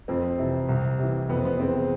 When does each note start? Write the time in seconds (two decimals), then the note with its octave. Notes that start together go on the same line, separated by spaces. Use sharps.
0.08 F2 C4
0.38 C3 E3
0.69 C2
0.99 C3 E3
1.29 F2 B3
1.37 C4
1.45 B3
1.59 C#3 E3 C4